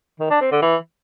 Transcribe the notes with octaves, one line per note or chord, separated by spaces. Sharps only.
D#3
D4
C4
D3
E3